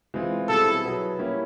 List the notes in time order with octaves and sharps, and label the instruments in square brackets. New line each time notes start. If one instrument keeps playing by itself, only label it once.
[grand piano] E3 G#3 C4 F4
[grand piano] B2 G3 C4 E4 G#4 [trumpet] A4
[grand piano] B2 F#3 B3 E4 G#4
G3 A#3 C#4 E4